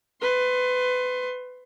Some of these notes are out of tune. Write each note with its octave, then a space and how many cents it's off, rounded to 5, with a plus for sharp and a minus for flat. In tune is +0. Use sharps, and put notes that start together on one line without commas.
B4 +25 C6 +15